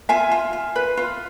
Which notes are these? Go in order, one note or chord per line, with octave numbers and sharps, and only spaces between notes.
F4 E5 G#5
F4
F4
B4
F4